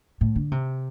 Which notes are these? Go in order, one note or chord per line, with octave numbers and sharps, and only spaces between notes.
A2
D3
C3